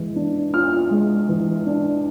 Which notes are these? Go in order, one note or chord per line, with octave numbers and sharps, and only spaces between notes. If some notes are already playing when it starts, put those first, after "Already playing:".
Already playing: E3 G#3
D4
F4 F6
G#3
E3
D4